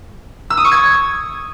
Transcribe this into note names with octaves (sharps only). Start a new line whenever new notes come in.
E6
D#6
C#6
G#6